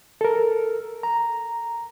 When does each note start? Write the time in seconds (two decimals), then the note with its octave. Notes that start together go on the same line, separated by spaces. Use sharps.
0.21 A4 A#4
1.03 A#5